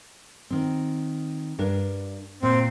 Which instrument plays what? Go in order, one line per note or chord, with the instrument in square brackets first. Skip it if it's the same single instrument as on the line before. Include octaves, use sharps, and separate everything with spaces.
[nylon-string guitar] D#3 C4
G2 D4 A#4
[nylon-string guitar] A#2 [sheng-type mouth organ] C4